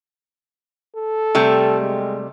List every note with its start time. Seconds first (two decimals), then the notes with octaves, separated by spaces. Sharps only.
0.97 A4
1.35 C3 G3 A3
1.81 G#3